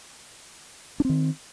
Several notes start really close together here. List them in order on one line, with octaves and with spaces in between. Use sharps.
D4 C4 D#3